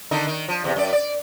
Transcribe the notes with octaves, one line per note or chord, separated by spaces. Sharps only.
D3 D#3 D#4
D#3
F3
E2 C3
F#2 D5
D5